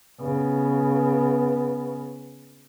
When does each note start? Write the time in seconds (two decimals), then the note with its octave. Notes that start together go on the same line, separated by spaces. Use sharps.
0.21 C#3 B3